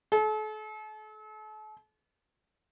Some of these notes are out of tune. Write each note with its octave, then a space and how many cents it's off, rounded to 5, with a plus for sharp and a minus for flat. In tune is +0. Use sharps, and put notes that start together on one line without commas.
A4 -40